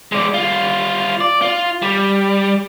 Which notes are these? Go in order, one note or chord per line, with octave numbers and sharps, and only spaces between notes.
G#3 D5
G3 F4
D5
F4
G3